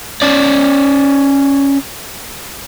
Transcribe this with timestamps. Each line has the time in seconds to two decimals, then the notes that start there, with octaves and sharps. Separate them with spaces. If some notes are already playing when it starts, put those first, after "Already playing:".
0.22 C#4 D5